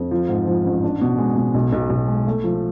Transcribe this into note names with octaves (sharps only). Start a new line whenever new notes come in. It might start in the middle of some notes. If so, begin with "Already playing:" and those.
Already playing: F2
F3
G#2
F3
A1
D4
B2
G#3
B2
B1
B1
B1
G#3
A3
F3